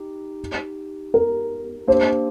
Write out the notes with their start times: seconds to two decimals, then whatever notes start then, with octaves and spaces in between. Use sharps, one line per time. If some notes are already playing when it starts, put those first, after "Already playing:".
Already playing: D#4 G4
1.14 A#4
1.88 A#3 D4 G4 C5